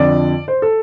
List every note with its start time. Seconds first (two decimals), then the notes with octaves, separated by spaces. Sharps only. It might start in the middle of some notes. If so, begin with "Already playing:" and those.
Already playing: F2 D3 F3 D5
0.48 C5
0.62 A4